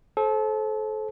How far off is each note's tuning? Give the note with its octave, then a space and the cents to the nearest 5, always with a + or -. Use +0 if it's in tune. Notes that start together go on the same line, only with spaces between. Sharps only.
A4 -30 C5 +20